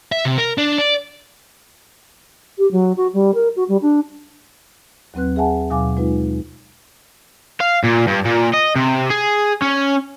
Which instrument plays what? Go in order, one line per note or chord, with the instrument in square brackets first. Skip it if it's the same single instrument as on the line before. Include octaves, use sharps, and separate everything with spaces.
[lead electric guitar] E5
C3
A#4
D4
D5
[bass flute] G4
F#3
F#4
G3
A#4
F#4
G3
D4
[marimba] D#2 F#3 C4 B4 F#6
G#4 E5 F#5 G#5 A5
D#2 B2 F#3 F5 G#5 D6
G#3 D#4 F4 B4
[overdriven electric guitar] F5
A#2
G2
A#2
D#5
C3
G#4
C#4